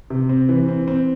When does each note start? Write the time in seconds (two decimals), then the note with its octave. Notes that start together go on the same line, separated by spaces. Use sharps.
0.10 C3
0.29 C4
0.49 E3
0.69 C4
0.88 C4